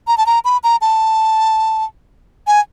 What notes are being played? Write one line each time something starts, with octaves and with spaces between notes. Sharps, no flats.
A#5
A5
A#5
B5
A#5
A5
G#5